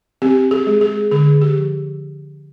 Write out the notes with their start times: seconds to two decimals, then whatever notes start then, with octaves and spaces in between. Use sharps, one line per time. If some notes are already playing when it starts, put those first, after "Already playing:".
0.22 C4 G4
0.51 G#4
0.67 G#3
0.81 G#4
1.11 D3 G#4
1.41 G4
1.56 F3